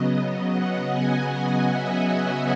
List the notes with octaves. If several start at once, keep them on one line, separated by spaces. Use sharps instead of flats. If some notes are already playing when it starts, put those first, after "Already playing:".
Already playing: C#3 F#3 B3 D#5
F#5
G#5
F#5
E5
F#5